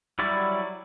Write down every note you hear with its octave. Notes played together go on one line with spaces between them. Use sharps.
F#3 G3 E4 D5